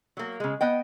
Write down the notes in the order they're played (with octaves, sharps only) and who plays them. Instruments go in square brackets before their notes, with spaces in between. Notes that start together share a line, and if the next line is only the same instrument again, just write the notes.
[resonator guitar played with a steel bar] F#3 A#3
C#3 G#3
B3 D#5 G5